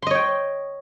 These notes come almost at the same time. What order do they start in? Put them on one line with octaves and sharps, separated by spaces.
C6 D#5 C#5 G5